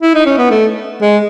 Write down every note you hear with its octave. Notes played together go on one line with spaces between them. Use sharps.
E4
D#4
C#4
B3
A3
G#3